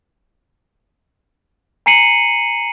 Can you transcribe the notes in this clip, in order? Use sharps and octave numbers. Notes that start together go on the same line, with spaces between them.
G#5 A#5 C7 C#7 D#7 F#7